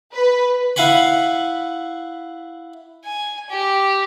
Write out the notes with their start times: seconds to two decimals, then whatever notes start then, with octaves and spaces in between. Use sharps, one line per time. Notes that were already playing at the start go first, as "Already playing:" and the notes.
0.14 B4
0.76 E4 F5 F#5 G#5 B5
3.04 G#5
3.50 G4